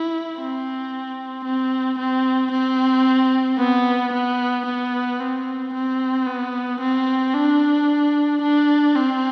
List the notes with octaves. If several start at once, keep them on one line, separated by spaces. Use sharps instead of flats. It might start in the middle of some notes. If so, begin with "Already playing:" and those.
Already playing: E4
C4
C4
C4
C4
B3
B3
B3
C4
C4
B3
C4
D4
D4
C4